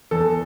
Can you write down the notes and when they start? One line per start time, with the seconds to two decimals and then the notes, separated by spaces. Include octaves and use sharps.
0.11 E2 A4